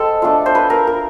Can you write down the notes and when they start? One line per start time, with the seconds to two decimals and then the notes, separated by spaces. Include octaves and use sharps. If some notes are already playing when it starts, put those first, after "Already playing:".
Already playing: G#3 C4 A4
0.22 A3 D4 F4
0.46 C5
0.55 B4
0.70 A#4
0.87 A#4